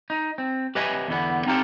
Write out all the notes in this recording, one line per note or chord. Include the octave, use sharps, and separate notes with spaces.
D#4
C4
G4 B4 D#5 E5 G#5
E2 D3 B3
C4 D#4 F4 G4 A4